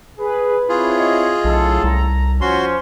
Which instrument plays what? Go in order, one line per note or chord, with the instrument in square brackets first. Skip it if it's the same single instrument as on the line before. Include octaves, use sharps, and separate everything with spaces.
[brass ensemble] G#4 [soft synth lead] B4
[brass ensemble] C4 E4 C#5 [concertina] F4 G#4
[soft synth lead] D#5
[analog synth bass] B1 [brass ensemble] A2 C#3 A4
[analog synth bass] C2 [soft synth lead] A#5
[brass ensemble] F3 C#4 [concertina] F#4 C6 [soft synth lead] C5